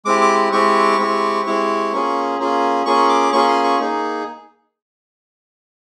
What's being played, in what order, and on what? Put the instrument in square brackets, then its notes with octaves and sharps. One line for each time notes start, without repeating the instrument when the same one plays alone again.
[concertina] G#3 C4 E4 G4 D6
D6
G#3 C4 E4 G4 C#6
G#3 C4 E4 G4
G#3 C4 E4 G4
A#3 C#4 F4 G#4
A#3 C#4 F4 G#4
A#3 C#4 F4 G#4 C#6
D6
A#3 C#4 F4 G#4 C#6
C6
C#6
A#3 D#4 G#4